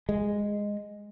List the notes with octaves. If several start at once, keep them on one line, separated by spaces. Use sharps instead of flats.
G#3